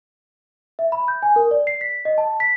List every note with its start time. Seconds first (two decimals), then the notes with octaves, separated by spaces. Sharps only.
0.79 E5
0.92 B5
1.08 G6
1.22 G#5
1.36 A#4
1.51 D5
1.67 C7
1.81 B6
2.05 D#5
2.18 A5
2.40 B6